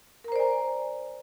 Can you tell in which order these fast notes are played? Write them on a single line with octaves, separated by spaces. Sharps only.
A#4 A#5 C5 D5 G#5